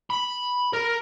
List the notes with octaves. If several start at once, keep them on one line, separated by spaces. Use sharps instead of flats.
B5
A#4